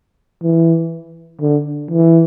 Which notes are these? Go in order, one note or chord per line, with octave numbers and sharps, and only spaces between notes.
E3
D3
E3